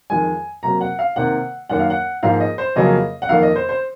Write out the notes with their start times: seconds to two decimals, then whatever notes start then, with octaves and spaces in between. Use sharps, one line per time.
0.10 F2 D#3 G#3 G#5
0.63 C3 F#3 A#3 A#5
0.81 F#5
0.99 F5
1.16 C3 D#3 A#3 F#5
1.69 F#2 D#3 A#3 F#5
1.79 F5
1.90 F#5
2.23 G#2 F3 A#3 F5
2.40 D#5
2.58 C5
2.76 F2 C#3 F#3 A#3 D#5
3.22 F#5
3.29 F2 D#3 A#3 F5
3.43 D#5
3.56 C5
3.69 C5